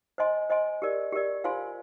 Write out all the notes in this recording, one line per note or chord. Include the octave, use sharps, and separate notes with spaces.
C5 D#5 G#5 C6
C5 D#5 G#5 C6
G4 A#4 D5
G4 A#4 D5
F4 C5 F5 G#5 C6